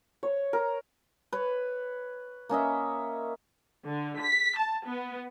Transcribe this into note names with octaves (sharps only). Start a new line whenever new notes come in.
C#5
A#4
B4 C#5
A#3 C#4 D#5 E5
D3
B6
A5
B3